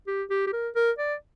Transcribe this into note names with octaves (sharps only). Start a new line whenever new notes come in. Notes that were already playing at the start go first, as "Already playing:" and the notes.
G4
G4
G4
A#4
A#4
D5